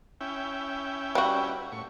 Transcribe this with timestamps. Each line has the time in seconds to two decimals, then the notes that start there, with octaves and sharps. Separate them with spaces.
0.21 C#4 E4 G5
1.15 G3 F#4
1.72 A2 C#6